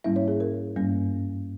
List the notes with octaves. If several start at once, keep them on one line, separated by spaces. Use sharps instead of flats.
G#2 G3 A#3 C#4 E4 E5
C#5
G#4
A#4
G2 G3 A#3 C#4